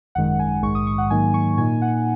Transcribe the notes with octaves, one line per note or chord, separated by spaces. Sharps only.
G#1 F#2 D#3 G#3 F#5
G#5
A#1 G#2 D#3 G#3 C#6
D#6
C#6
F#5
G#2 D#3 F#3 A#3 D#4 G#5
C#6
A#2 A#3 D#4 G#5
F#5